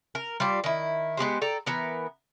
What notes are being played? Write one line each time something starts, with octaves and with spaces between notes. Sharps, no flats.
A#4
G3 F4 D5
D#3 E4
G#3 B3 G4 C5
A4 D5 G5 A#5
E3 B3 A#4